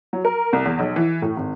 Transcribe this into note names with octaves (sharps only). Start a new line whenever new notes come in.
F#3
A#4
C2
E2
B1
E3
A2
G#1